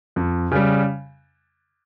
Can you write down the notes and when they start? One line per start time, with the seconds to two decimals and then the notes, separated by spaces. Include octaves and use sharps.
0.16 F2
0.51 C#3 G3